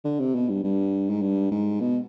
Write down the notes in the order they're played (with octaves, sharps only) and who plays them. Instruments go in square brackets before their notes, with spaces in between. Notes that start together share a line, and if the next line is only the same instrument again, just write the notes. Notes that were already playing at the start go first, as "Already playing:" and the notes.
[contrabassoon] D3
C3
B2
G2
G2
G#2
G2
G#2
B2